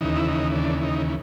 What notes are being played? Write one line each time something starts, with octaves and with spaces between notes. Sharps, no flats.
D#2 C#3 E3 D#4
E4
D#4
D4
D#4